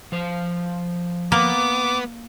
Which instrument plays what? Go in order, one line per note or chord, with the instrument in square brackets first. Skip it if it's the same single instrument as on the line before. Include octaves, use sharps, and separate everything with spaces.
[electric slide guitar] F3 C5
[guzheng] A#3 [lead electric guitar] B3 [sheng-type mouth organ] D6